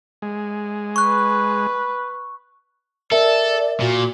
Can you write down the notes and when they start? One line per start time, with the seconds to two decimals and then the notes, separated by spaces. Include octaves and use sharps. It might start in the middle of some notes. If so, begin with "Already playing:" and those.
0.22 G#3
0.96 B4 C#6 F#6
3.12 A4 A#4 D5 E5
3.80 A#2 F#4